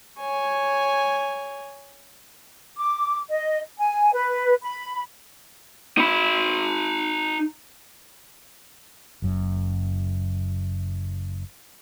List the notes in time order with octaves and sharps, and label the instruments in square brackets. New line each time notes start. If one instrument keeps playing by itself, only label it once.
[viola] C#5 G#5
[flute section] D6
D#5
G#5
B4
B5
[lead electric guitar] D#4 B5
[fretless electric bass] F#1 F#2